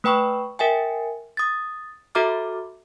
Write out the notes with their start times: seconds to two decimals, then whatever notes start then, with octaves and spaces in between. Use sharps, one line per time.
0.04 A3 B4 G5 B5 C#6
0.59 A#4 E5 G5 G#5
1.37 D#6 A6
2.15 F#4 A4 E5 A#5 D6 F6